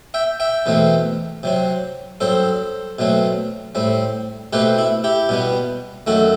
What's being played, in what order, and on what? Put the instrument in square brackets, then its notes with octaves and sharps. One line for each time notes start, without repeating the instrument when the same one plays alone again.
[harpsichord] E5 G5
E5 G5
E2 B2 A3 C4
C3 F#3 C4
G2 F#3 C4 A4 C5
B2 F#3 A3 C4
A2 G3 C4
B2 A3 C4 G4 B4
E4
E4 G4
B2 G3 B3
F#2 D#3 A3 F#4 A4